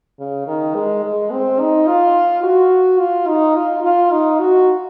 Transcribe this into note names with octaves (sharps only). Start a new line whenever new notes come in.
C#3
D#3
G#3
G#3
C4
D#4
F4
F#4
F4
D#4
F4
F4
D#4
F#4